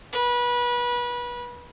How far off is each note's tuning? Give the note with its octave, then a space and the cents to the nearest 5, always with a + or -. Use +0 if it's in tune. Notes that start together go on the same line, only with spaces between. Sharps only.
B4 -25